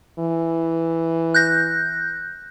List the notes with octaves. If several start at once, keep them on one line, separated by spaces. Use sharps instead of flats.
E3
F#6 G6 A#6